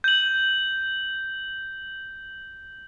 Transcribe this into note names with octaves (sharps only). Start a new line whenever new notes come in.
G6 F#7